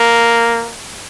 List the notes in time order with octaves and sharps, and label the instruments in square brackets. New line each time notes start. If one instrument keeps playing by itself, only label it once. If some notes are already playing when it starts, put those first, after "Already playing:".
Already playing: [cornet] A#3